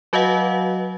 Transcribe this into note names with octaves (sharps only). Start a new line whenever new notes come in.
F#3 F#4 B4 D#5 F5 F#5